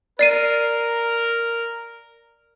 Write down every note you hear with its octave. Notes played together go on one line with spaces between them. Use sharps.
A#4 D5 C7 D#7